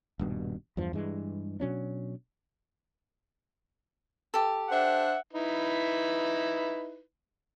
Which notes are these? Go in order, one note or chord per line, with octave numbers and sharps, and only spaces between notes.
D#1 G2 B2
E2 G2 F3
G2 E3 G#3
B2 F#3 C#4 D4
G4 A4
D4 C5 E5 F#5
D#4 E4 B4